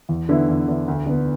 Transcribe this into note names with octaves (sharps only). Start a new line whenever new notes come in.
E2
D3 B3 E4
E2
D3 B3 E4
D2
D3 B3